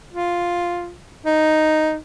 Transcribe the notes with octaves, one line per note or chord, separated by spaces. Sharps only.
F4
D#4